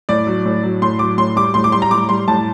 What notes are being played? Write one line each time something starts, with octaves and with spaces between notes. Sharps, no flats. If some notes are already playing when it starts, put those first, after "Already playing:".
A2 D5
F#3
A2
F#3
A2 C6
F#3 D6
A2 C6
G3 D6
A2 C6
D6
G3 C6
A#5
A2 D6
G3 C6
A2 A5